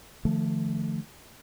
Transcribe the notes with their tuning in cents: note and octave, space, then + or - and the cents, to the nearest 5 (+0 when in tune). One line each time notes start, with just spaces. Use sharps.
D3 +40 F3 -25 A3 +0